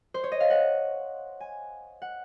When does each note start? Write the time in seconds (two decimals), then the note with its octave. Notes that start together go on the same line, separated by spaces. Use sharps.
0.14 C5
0.24 C#5
0.32 D#5
0.40 F5
0.50 F#5
1.40 G#5
2.02 F#5